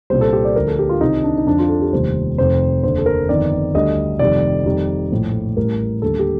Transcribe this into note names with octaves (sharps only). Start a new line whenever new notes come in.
C2 A#2 G3 C5
A4
G4
D5
D2 D3 F3 A#4
A4
G4
F4
C2 C3 D#3 D#4
D4
D#4
F2 D3 F3 D4
F4
A4
G4
F1 D#2 D#3 G3 C5
F1 F2 D#3 C5
F1 D#2 D3 C5
A4
A#4
G1 F2 D#3 D5
D2 D3 G3 D#5
F1 F2 D#3 G3 D5
F2 D#3 G3
A#1 A2 F3
A1 A2 G3 A#4
D#2 D3 G3 A4
G4